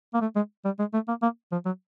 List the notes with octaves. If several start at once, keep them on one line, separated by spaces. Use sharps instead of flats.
A#3
A3
G#3
G3
G#3
A3
A#3
A#3
F3
F#3